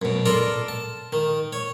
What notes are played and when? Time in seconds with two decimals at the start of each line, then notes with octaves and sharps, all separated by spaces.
0.02 F#2 B2
0.26 F4 A4 A#4 D5
0.68 A5
1.13 D#3
1.53 C#5